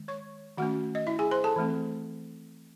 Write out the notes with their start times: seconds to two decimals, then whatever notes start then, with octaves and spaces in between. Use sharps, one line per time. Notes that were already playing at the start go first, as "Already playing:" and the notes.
Already playing: D#3 G#3
0.08 C#5 C#6
0.58 D#3 A3 C#4 F#4 F#5
0.95 D#5
1.07 E4 E5
1.19 G#4 G#5
1.31 C5 C6
1.44 A4 A5
1.56 E3 A3 C4